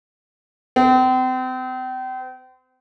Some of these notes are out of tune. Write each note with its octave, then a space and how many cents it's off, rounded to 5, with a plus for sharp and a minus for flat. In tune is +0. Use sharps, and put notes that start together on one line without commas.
C4 -35